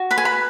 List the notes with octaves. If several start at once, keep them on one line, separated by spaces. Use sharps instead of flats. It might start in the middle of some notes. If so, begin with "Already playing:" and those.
Already playing: F#4
B4 B5
G#5
B5